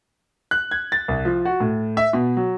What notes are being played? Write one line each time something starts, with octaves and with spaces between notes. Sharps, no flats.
F#6
G#6
A6
C2
F3
F#4
A2
E5
B2
F#3